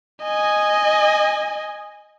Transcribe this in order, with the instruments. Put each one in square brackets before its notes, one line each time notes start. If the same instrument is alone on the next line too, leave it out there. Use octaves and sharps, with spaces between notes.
[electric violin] D#5 G#5